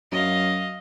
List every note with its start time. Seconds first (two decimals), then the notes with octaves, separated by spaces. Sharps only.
0.12 F#2 D#5 F5